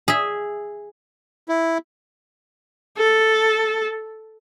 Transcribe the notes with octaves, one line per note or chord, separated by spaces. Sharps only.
G#4 E5
E4
A4